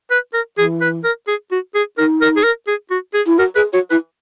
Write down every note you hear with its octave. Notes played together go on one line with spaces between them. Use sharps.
B4
A#4
E3 G#4
B4
A#4
G#4
F#4
G#4
D#4 A#4
A#4
G#4
A#4
G#4
F#4
G#4
E4
F#4 A#4
G#4 B4
F#4 C#5
E4 B4